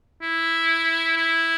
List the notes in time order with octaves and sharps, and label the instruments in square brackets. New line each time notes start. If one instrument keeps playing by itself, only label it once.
[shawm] E4
E4